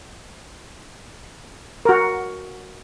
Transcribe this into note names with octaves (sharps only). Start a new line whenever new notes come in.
F#4 A#4